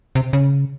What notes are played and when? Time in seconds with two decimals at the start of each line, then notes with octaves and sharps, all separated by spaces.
0.15 C3
0.33 C#3